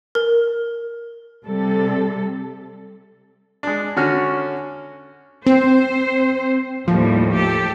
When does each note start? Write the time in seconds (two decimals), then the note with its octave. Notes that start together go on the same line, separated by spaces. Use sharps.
0.15 A#4
1.45 C3 G3 A4
3.63 G#3 D4
3.97 D3 C#4 F#4 F6
5.46 C4 C5
6.88 D#2 A2 F3 G3
7.34 G4 A4